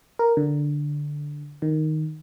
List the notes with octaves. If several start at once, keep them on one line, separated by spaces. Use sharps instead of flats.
A#4
D3
D#3